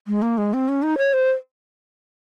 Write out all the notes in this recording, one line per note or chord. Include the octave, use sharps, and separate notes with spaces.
G#3
A#3
G#3
C4
C#4
D#4
C#5
C5